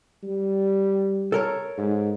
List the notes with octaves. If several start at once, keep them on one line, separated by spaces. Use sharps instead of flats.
G3
A4 A#4 C#5
G#2